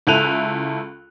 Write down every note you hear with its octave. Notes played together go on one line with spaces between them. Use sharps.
C#2 E4 A4 F#6 D#7 F7